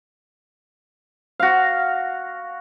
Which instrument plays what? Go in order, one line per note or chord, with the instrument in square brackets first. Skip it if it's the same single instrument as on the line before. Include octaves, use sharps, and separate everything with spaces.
[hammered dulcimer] F#4 F5